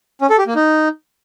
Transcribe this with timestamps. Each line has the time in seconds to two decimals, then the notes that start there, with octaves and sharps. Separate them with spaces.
0.21 C#4
0.30 A4
0.38 G4
0.47 A#3
0.55 D#4